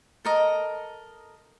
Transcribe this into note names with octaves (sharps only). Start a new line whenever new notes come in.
A4 A#4 D#5